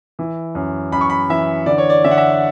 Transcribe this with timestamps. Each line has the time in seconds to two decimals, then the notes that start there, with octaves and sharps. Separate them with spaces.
0.19 E3
0.55 F#2
0.92 F#2 B5
1.01 C#6
1.10 B5
1.29 E3 E5
1.66 D3 D5
1.78 C#5
1.90 D5
2.04 D3 E5
2.11 F#5
2.17 E5